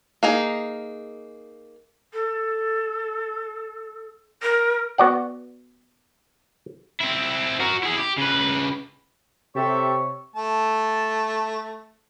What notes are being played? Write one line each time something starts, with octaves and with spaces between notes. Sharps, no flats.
A#3 D#4 G#4
A4
A#4
B3 F#4 D5 F#5
C4 E4
F#4 A#4
E4 G#4
G4
C#3 B4
C3 G4 A4 C#5 E5
A3 A5